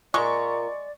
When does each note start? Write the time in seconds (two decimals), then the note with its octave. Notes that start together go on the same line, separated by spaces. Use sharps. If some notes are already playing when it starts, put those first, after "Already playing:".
0.14 G#3 F4 A#4 D5 C#6